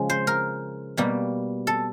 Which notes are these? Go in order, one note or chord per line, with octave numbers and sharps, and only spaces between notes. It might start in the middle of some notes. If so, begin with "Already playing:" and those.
Already playing: C#3 F3 G#3
C5
A#4
B2 G3 A#3
A4